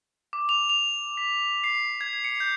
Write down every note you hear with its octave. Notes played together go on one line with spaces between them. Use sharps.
D6
F7
F7
B6
C7
G#6
C#7
G6